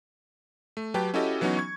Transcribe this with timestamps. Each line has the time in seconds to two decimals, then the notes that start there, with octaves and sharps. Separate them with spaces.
0.77 A3
0.94 F#3 G4 B4 G5 A5
1.14 C#4 E4 F#4 G4 A4 D#5
1.41 E3 F#3 B3 C#4 D#4 F#4
1.57 C#6 G#6